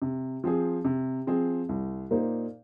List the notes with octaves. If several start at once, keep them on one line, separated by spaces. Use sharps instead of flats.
C3
F3 C4 G#4
C3
F3 C4 G#4
C2
A#2 A#3 D#4 C5